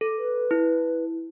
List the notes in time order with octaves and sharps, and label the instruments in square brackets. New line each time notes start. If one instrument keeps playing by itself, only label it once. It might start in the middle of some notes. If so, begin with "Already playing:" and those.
[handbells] A4
[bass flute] B4
[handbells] E4